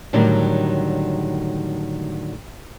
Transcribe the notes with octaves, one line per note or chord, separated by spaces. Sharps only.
A2 D3 D#3 F#3 G3